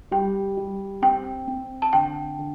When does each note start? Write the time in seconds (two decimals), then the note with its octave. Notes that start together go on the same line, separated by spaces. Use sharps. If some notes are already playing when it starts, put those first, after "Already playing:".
0.11 G3 G5
0.57 G3
1.02 C4 G5
1.47 C4
1.82 A5
1.93 D3 G5
2.39 D3